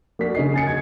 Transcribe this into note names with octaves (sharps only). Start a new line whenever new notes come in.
A#3 F#4 D5 B6
C#3 C#4 D#5 C7
G#5 A6 C#7
G#6